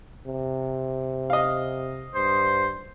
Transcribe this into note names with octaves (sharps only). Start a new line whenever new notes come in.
C3
D#5 F5
G2 C5